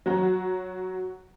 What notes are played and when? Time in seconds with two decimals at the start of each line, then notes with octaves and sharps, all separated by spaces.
0.06 F#3 F#4 A#5